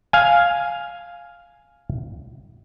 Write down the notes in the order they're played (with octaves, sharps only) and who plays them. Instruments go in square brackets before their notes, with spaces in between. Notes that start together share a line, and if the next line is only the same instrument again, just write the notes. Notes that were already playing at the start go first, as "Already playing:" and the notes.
[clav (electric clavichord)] F5 G#5